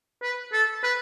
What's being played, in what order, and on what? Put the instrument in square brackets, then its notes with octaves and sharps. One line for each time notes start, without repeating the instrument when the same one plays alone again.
[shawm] B4
A4
B4